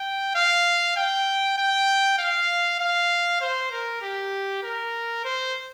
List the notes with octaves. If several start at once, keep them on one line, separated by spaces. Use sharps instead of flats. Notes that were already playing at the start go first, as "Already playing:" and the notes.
Already playing: G5
F5
G5
G5
F5
F5
C5
A#4
G4
A#4
C5